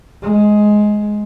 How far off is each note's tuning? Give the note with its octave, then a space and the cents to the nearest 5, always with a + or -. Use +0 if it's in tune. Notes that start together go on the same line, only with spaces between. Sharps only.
G#3 +10